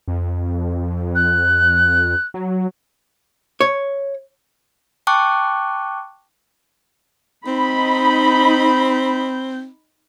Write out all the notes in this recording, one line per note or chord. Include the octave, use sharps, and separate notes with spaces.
F2
F#6
F#3
C#5
G5 A5 C#6 D6 F#6
C4 D#4 B5